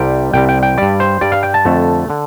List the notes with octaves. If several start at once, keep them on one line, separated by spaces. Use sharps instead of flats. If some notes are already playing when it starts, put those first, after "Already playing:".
Already playing: C2 C3 G3 G5
C2 C3 G3 G5
G5
G5
G2 G3 D5
C5
G2 G3 D5
F5
G5
A5
F2 D3 A3
D3